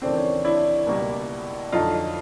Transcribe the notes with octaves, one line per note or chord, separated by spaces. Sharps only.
D#2 C#3 E3 A3 C4 D4
C#4
D4 E4
C#2 B2 G3 A#3
F2 D3 F#3 A3 D#4 F4